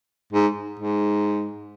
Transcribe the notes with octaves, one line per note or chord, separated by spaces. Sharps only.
G#2
G#2